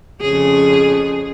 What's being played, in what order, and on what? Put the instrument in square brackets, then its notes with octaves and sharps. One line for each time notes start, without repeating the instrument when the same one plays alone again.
[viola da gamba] F2 C#3 G#4